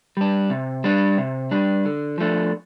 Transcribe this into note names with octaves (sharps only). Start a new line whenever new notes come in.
G3 D4
C3
G3 D4
C3
G3 D4
D3
F3 A3 D4